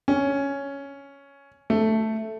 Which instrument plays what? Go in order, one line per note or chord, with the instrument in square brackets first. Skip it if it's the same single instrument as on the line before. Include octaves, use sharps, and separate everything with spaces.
[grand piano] C#4
A3